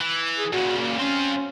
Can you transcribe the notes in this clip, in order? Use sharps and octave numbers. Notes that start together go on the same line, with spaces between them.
E3
G#4
A#2 C#3 F#4
A#3
C4 C#4 F5